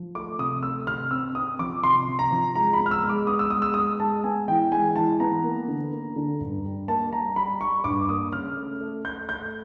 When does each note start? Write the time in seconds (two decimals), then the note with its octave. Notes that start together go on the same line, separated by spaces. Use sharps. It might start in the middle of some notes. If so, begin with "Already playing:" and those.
Already playing: F3
0.15 A3 D6
0.39 C3 D#6
0.63 A3 E6
0.87 C3 F6
1.11 C4 E6
1.35 C4 D#6
1.59 F3 D6
1.83 C3 C6
2.08 C3
2.19 A#5
2.32 F3
2.55 G#3 A#5
2.73 B5
2.79 B3
2.86 F6
2.91 E6
3.03 G#3
3.09 D6
3.27 B3 D#6
3.39 E6
3.50 G#3 D#6
3.62 E6
3.74 G#3 D#6
4.00 G#3 A5
4.23 B3 G#5
4.48 E3 G5
4.72 G#3 G#5
4.96 E3 A5
5.20 B3 A#5
5.44 A#3
5.68 D3
5.92 A#3
6.16 D3
6.40 G2
6.64 G3
6.88 A#3 A5
7.13 G3 A#5
7.36 G3 B5
7.61 G3 C#6
7.84 G2 D6
8.09 A#3 D#6
8.33 C#3 F6
8.57 A3
8.81 A3
9.05 A3 G6
9.28 A3 G6